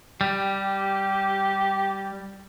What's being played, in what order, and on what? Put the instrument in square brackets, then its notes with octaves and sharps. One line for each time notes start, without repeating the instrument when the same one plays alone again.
[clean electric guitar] G3 [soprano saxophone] G4